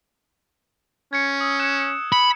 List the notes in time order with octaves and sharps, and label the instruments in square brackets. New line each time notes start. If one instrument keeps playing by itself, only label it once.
[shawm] C#4 [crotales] G#6 C#7
[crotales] D#6 E6
F#6 G#6 E7
[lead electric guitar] B5 [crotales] C#7